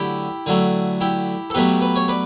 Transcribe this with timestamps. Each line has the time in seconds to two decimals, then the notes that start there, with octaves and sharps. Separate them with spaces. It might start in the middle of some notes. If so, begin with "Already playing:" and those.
Already playing: D3 F#3 A3 E4 G4
0.46 D3 F#3 A3
1.01 E4 G4
1.50 A4
1.54 B2 F#3 A3 G4 B4
1.82 B4
1.96 C#5
2.08 B4 D5